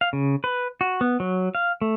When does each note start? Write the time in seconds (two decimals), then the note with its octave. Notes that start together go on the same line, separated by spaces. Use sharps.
0.01 F5
0.13 C#3
0.44 B4
0.81 F#4
1.01 B3
1.20 F#3
1.55 F5
1.81 A3